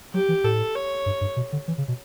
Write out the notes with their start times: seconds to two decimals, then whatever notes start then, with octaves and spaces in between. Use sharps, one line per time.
0.14 F#3 G4
0.29 E3
0.44 A2 A4
0.75 C#5
1.06 G2
1.21 G2
1.37 B2
1.53 D3
1.68 E3
1.78 C#3
1.88 B2